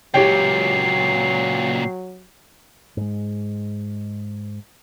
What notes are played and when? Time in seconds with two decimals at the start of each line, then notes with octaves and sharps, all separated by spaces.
0.14 C#2 A#2 F#3 G4 C#5 G5 C7
2.97 G#2 G#3